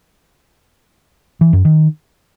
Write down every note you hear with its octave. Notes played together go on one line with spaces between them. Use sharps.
E3
F#2
D#3